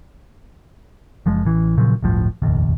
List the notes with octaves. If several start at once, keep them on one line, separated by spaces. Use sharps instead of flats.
F#1 F3 G#3
A1 E3
A#2 C#3 F3 F#3
D1 G1 A2 F3
F1 A#1 D#2